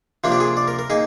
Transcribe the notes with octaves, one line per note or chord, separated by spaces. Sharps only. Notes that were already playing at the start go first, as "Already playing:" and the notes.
C3 F3 A#3 D4 F4
G4
G#4
D5
A#4
A#4
A#3 D#4 G#4